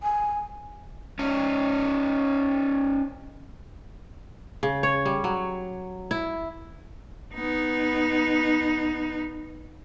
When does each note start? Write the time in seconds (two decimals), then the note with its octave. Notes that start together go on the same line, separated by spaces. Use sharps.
0.03 G#5
1.19 C#4 D#4
4.63 C#3
4.83 C#5
5.05 G3
5.24 F#3
6.11 E4
7.35 B3 D#4